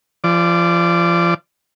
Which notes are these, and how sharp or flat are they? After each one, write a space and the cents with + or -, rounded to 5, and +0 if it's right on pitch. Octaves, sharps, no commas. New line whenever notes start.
F3 -30 D5 +0